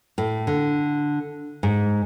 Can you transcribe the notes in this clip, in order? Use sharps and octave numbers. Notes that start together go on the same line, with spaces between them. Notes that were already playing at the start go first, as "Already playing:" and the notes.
A2
D3
G#2